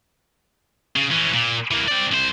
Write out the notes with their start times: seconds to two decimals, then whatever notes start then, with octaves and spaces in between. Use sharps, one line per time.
0.96 C#3
1.11 E3 C#4
1.33 A#2
1.71 E3 A#3
1.88 C4 D5
2.12 C2 C5